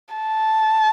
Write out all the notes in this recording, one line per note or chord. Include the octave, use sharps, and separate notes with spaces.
A5